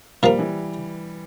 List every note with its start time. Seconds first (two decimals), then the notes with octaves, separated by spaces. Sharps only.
0.23 A#2 F3 G3 A#3
0.39 E3